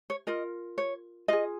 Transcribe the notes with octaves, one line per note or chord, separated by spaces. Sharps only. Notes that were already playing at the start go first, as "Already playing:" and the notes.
C#5
F4 A#4 D#5
C#5
F4 G#4 D#5